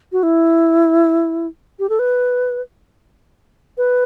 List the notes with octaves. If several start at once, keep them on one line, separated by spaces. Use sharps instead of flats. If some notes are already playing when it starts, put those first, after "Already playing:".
F#4
E4
G4
A4
B4
B4